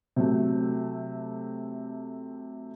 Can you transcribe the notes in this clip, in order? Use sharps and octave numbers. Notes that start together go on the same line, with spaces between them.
C3 F#3 A3